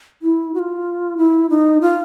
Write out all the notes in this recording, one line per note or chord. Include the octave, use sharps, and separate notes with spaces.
E4
F#4
F4
E4
D#4
F4